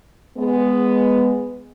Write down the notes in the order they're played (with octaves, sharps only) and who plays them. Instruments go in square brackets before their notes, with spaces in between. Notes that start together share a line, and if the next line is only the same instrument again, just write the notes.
[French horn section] G#3 B3